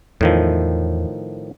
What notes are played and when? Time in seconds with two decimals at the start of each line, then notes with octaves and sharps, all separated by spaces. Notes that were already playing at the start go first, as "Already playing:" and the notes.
0.21 E2 A2 D#3 F3